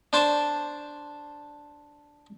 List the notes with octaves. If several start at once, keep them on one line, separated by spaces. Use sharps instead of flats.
D4 C5 A5 C#6